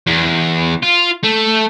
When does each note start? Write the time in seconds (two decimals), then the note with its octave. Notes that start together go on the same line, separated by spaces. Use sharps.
0.07 E2
0.83 F4
1.23 A3